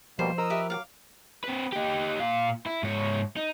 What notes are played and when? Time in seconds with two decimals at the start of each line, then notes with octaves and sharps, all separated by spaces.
0.19 B2 F3 G3 A#3 C5
0.38 A#4 D#5 D#6 E6
0.50 G4 B4 E5
0.70 F#3 F5 F#5 D6
1.44 C4 B4
1.72 D#4 G4
2.20 A#2 F5
2.66 E4
2.83 G#2 C#5
3.37 D#4